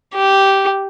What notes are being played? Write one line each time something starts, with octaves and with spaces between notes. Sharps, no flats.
G4